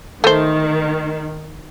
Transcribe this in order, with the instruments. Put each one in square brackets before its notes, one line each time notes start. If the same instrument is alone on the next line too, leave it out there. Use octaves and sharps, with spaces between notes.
[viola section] D#3 [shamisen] A3 C5